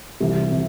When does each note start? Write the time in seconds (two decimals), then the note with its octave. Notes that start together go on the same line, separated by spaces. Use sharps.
0.20 C2 C3 E3
0.51 C3 E3